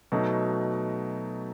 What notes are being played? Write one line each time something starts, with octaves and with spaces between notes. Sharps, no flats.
B2 F#3 A3 D#4